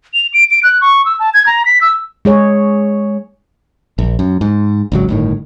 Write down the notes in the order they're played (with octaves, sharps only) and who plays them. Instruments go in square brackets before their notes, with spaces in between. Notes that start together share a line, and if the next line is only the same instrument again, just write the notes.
[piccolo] F7
D7
D7
F#6
C#6
E6
A5
G#6
A#5
B6
E6
[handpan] G#3 G#4 C#5
[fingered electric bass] A#1
F#2
G#2
G#1 C#2 F#3
G1 A2 D#3